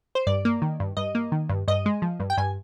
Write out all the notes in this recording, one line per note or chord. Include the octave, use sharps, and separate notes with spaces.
C5
G2 D5
A#3
D#3
G2
G2 D#5
A#3
D#3
G2
G2 D#5
G#3
F3
G2
G5
G2 G#5